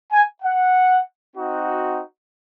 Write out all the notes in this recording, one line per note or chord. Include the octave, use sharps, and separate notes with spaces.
G#5
F#5
C4 D#4 F#4